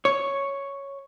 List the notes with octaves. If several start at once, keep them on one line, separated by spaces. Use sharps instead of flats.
C#5